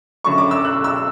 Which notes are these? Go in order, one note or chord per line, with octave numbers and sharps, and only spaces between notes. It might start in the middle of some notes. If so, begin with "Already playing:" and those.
F#2 D3 C#6
D6
E6
F#6
E6